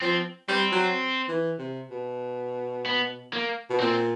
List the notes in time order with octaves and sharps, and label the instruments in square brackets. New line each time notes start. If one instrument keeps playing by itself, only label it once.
[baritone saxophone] F3 [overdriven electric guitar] C4
[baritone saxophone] G3 [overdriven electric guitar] C4
[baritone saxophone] F#3
E3
C3
B2
[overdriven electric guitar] B3
A#3
[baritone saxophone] B2
[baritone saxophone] A#2 [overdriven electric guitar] C4